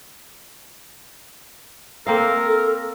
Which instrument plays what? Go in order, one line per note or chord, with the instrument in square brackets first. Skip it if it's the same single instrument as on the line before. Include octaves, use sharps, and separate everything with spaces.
[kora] A#3 C4 F5 [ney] A4 [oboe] A#4